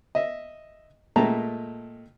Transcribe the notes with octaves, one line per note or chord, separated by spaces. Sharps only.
D#5 E5
A#2 G#3 A3 G5 A5 A#5